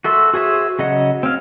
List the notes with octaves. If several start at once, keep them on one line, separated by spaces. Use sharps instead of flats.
F#4 A4 E5 C6
F#4 G#4 C5 E5
C#3 F#3 D#5 F#5
C4 C#4 F5